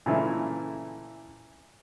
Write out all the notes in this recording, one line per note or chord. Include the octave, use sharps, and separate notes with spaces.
A#2 C#3 E3 A3 E4